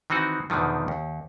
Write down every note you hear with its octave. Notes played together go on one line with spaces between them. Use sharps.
D#3 E3 C4 D#4 F#4
E2 B2 D3 D#3 F3
D#2